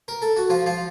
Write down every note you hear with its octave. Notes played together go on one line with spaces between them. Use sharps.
A#4
A4
F#4
F3 F4
F3 F4